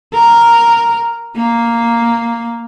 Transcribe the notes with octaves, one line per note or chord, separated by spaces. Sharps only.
A#4
A#3